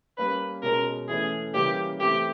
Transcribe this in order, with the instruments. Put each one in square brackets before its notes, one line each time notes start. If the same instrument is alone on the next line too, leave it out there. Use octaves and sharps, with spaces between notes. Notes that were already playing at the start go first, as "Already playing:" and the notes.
[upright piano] G3 A#3 C#4 [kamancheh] B4
[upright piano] B2 G#3 C#4 [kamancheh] A#4
[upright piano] E3 A3 C#4 [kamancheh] G#4
[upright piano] C#3 E3 G3 A#3 C#4 [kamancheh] G4
[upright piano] E3 A3 C4 E4 [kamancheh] G4